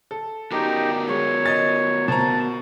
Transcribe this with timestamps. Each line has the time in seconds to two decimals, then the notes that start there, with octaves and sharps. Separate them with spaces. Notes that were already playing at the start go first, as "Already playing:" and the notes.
0.11 A4
0.52 B3 D#4 F#4 G4 A#4
1.09 G#3 C#5
1.46 D#5 A6
2.08 B2 C5 A5 A#5